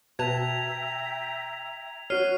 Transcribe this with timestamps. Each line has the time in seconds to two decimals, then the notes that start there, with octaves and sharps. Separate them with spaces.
0.19 B2 B4 E5 G5 A5 A#5 G#6 F7
2.10 F#4 C#5 F6 F#6 C7 D#7